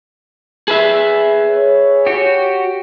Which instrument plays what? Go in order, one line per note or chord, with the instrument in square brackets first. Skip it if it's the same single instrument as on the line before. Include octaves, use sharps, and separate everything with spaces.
[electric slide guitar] G#4 B4 E5
[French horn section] C#5
[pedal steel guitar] F#4 G4